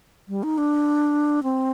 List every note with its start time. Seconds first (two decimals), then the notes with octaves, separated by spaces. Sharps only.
0.28 G3
0.43 D#4
0.58 D4
1.43 C4